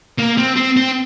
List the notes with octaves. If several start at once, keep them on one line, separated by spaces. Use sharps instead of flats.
A#3
C4
C4
C4